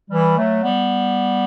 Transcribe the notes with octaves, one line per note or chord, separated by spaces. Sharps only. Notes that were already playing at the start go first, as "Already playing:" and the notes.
E3 G3
F#3 A3
G3 B3